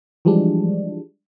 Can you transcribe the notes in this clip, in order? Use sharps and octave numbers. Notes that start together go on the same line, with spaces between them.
E3 F3 G3 G#3 D4